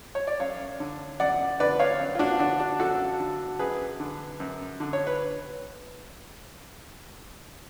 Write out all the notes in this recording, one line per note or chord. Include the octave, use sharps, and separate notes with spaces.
C#5
D5
F#2 C#5 F5
D3
F#2 D5 F#5
D3 B4 D5
C#5 F5
F#2
F4
D4 F#4
F4
D3 D4 F#4
D4 F#4
F#2 F#4 A4
D3
F#2 G#4 B4
D3
F#2
D3
C#5
B4